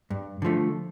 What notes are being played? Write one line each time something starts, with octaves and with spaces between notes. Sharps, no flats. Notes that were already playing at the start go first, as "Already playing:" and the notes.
G2
D3 F3 A3